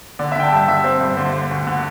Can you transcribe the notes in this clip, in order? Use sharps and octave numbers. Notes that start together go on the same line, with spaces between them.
D3 D5
E5
D3 G5
A5
G2 E5
D3 E5
C4
G2
D3 C5
D3
D2
D3